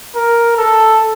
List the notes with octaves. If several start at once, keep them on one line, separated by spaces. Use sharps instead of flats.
A#4
A4